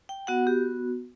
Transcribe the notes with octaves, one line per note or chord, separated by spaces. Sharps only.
G5
B3 F#4 F#5
G4